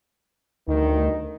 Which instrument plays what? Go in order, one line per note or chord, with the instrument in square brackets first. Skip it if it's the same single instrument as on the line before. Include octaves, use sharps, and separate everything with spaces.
[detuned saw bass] D2 [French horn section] G2 D#3 D#4